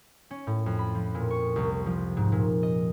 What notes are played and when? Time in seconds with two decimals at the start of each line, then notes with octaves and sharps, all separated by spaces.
0.31 C#4
0.47 A2
0.66 F2
0.79 B5
0.95 F3
1.15 A#2
1.31 C#6
1.56 C2
1.86 F3
2.17 G#2
2.32 A#2
2.63 D#5